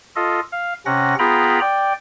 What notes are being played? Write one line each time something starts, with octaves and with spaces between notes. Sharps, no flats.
F4 A4 D#5
F5
C3 C#4 F#5 A#6
B3 F4 G#4 G5 A#5 B5
D5 G5